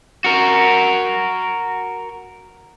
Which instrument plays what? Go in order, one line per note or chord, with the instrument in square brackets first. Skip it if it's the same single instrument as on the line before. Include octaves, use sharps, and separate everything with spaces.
[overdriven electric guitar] F#4 A#4